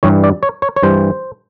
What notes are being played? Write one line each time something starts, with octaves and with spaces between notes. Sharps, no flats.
G2 E3 G3 C#5
D5
C#5
C#5
C#5
G2 E3 G3 C5